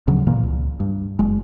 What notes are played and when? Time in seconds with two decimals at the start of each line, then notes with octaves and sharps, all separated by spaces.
0.07 D2 C#3 F3 F#3
0.27 A#2 E3 A#3
0.43 C#2
0.80 G2
1.19 F#1 G#3